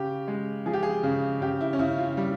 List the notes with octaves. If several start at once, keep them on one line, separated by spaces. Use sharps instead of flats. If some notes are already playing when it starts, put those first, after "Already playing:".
Already playing: C#3 G4
G#3
F3 G#4
G4
G#4
C#3
C#3 G4
E4
C#4
C#3 E4
F4
G3